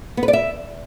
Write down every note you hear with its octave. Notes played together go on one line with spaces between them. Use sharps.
B3
B4
D5
E5